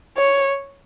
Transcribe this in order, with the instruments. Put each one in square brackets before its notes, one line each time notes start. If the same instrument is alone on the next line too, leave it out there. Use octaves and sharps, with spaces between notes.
[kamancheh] C#5